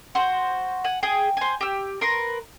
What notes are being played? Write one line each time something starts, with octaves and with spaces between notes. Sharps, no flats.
F#4 C5
F#5 G#5
G#4 G5
C5 G#5
G4 E6
A#4 B4 C6